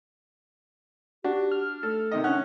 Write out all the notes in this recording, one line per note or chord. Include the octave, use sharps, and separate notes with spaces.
D4 F#4 G4
F6
A3 A4
C3 D#3 D#5
C#4 D4 F#5